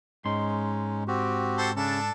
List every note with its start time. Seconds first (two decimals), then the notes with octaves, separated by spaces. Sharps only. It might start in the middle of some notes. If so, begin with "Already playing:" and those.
0.25 G#2 G#3 C#4 D#4 C6
1.08 C4 F#4 G4
1.58 A4 C5
1.76 C#3 C#4 D4 A4